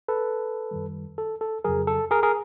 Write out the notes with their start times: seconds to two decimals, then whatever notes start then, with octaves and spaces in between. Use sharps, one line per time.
0.08 A4 B4
0.71 F#2 D#3 G3
1.18 A4
1.41 A4
1.64 F2 C#3 F#3 G#4 A#4
1.87 A4
2.11 G#4 A#4
2.23 G#4 A#4